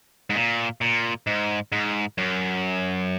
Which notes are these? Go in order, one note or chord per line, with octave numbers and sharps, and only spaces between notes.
G#2
A#2
A#2
G#2
G#2
F#2